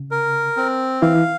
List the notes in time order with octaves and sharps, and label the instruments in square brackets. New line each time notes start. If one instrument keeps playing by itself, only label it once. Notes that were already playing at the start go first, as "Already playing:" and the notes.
Already playing: [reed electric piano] C#3
[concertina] A#4
C4
[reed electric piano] E3 E4 [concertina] F5